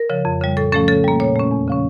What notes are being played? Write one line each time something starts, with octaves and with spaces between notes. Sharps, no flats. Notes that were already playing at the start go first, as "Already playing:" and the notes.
Already playing: A#4
C#3 F3
F2
C#3 G3
A2 A4
F3 A3 C#4 A4
C#3 A4
G3 A#3
A#2 C#5
A3 C#4
E2
C#3 F3 C#4